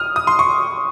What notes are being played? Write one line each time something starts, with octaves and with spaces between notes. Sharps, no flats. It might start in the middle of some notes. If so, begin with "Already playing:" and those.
Already playing: D#6 F6
D#6
C6
C#6